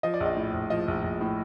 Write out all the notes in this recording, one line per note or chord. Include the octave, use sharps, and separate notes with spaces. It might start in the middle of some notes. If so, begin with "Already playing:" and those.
F3 D#5
D5
A#1
D#5
A2
A#1
F3 D#5
A#1
A#1
A2